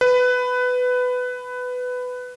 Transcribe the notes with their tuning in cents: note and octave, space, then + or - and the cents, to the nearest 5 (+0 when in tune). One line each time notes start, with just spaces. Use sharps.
B4 +15